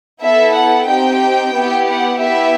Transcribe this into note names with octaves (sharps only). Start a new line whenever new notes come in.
B3 E4 A4 E5
F#5
C4 D#4 G4 G5
B3 E4 G4
F#5
B3 E4 G4 E5